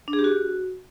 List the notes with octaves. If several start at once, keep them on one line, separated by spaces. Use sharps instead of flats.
D4
G#4
G4
F#4